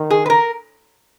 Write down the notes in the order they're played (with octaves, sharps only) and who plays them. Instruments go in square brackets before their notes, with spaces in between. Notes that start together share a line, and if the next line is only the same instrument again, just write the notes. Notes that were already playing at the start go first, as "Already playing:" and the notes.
Already playing: [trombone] D#3
[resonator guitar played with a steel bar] G#4
B4
A#4